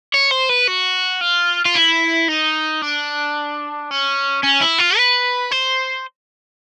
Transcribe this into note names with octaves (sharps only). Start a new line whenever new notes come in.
C#5
C5
B4
F#4
F4
F4
E4
D#4
D4
C#4
C#4
E4
F4
B4
C5